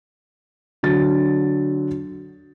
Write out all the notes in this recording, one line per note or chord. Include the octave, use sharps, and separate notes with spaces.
D3 F#3 A6